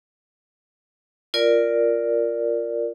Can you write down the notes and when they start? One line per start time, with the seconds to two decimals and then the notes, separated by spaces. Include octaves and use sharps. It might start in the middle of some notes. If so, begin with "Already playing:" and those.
1.34 F4 A#4 D5